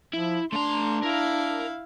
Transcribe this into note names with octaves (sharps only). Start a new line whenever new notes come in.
F3 E4
A3 D4 A#5 C6
E4 A#4 F5